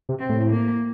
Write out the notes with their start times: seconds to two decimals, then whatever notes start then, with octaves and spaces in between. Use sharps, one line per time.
0.09 C3
0.19 C4
0.29 A2
0.50 A#3